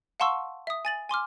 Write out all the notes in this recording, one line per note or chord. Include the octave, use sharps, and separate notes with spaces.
F5 F#5 A5 C6 C#6 E6
E5 D#6
G#5 A6 F#7
G#5 C6 D6 F6